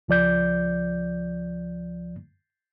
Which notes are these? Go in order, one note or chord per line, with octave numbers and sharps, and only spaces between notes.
C#2 F3 D5 G6